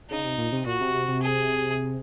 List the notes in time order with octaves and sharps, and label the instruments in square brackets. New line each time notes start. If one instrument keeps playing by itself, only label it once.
[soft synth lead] C#3 [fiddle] D#4
[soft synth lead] C3
A#2
C3
[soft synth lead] A#2 [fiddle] F#4
[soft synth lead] C3
C3
C3
[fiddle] G#4